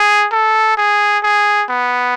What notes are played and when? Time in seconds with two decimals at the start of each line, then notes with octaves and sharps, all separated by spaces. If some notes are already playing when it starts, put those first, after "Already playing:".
Already playing: G#4
0.32 A4
0.77 G#4
1.23 G#4
1.70 B3